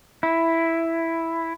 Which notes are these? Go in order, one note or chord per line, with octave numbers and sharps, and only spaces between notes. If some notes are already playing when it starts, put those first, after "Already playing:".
E4